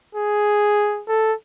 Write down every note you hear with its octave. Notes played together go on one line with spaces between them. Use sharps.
G#4
A4